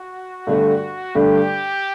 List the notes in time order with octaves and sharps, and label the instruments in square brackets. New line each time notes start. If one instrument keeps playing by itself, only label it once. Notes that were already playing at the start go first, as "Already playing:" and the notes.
Already playing: [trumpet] F#4
[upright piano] G2 D3 A3
[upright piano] G2 D3 A3 [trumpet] G4